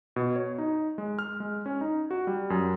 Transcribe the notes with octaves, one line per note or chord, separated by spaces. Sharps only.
B2
C#5
D#4
G#3
F6
G#3
C#4
D#4
F#4
G3
F#2